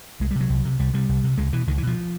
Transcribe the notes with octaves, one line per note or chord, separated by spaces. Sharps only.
C2 G#3
G3
C3
F#3
C2
C3
C2 G3
C3 G3
C2
C3
C#2 G#3
B2 E3
C#2 D#3
E3
B2 F3